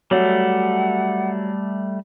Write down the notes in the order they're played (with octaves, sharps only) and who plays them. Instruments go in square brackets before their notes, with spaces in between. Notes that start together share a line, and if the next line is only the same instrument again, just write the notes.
[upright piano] F#3 [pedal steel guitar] G3 A3 [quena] F#5